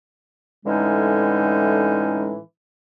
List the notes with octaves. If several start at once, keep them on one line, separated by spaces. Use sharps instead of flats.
A2 D3 E3 G#3 C#4 D#4